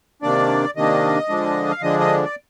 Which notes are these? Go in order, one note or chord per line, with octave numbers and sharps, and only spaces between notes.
C3 D#3 A#3 D4 D5
C3 D#3 A#3 D4 D#5
D3 F3 G#3 D4
F5
D3 F3 G#3 D4 D#5
D#5
D5